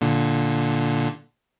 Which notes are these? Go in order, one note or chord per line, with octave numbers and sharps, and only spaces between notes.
A#2 D3